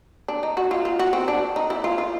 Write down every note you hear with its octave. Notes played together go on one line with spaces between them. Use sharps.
D4
D#4
F#4
F4
F4
F#4
C4
D4
D#4
E4
F4
F4